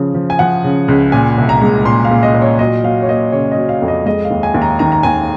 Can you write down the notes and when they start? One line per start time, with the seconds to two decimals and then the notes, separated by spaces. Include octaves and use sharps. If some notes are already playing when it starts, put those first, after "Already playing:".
Already playing: C#3 F3
0.14 F3
0.30 G#5
0.39 F3 F#5
0.64 C#3
0.88 C#2
1.12 A#2 G#5
1.38 C2
1.49 A#5
1.62 G#3
1.85 A#2 C6
2.05 F5
2.11 A#2
2.23 D#5
2.34 A#2
2.42 C#5
2.59 F#3 D#5
2.84 F#3 F5
3.02 C#5
3.08 A#3 D#5
3.32 C#3 C#5
3.52 D#5
3.57 F#3
3.69 F5
3.82 F2
3.88 D#5
4.06 G#3 D#5
4.24 F5
4.31 D#2
4.43 G#5
4.54 D#2
4.62 A#5
4.79 D#3 A#5
4.92 A#5
5.03 D#2 G#5